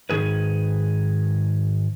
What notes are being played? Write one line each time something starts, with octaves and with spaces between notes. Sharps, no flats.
G#2 D#3 G#4 B4